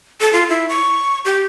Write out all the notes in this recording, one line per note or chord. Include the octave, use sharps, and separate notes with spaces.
A4
F4
E4
C#6
G4